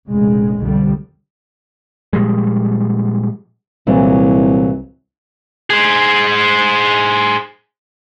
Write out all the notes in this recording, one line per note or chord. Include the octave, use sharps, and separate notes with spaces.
F1 E2 A#2 C#3 G#3
C2 F2 B2 D3 F3 G3
A#2 F3 G3 G#3
C2 A#2 E3 F#3
G#4 C5